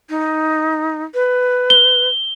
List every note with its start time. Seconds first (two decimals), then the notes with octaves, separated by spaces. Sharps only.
0.09 D#4
1.14 B4
1.70 G7